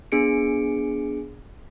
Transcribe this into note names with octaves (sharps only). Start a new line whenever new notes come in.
B3 D4 G#4 C#7 D7